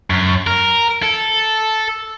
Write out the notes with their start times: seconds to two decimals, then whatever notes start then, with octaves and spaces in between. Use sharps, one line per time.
0.10 F#2
0.47 A#4
1.03 A4